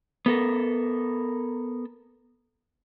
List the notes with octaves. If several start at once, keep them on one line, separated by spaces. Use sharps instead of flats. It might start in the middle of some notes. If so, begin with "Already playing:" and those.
B3 A4 A#4